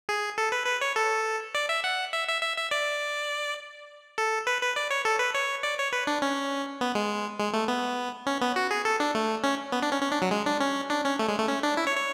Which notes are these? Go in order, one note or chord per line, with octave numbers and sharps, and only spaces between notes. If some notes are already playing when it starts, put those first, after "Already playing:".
G#4
A4
B4
B4
C#5
A4
D5
E5
F#5
E5
E5
E5
E5
D5
A4
B4
B4
D5
C#5
A4
B4
C#5
D5
C#5
B4
D4
C#4
B3
G#3
G#3
A3
B3
C#4
B3
F#4
G#4
A4
D4
A3
C#4
B3
D4
C#4
C#4
D4
F#3
G#3
D4
C#4
D4
C#4
A3
G#3
A3
C#4
D4
E4
C#5
C#5